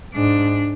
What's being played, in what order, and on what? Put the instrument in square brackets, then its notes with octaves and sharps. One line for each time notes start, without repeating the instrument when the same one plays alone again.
[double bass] G#2 [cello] D4